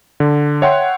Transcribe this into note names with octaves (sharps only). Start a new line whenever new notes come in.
D3
C#5 E5 F#5 G5 C6